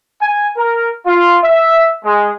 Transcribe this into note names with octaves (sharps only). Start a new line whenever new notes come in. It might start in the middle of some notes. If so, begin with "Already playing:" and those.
G#5
A#4
F4
E5
G#3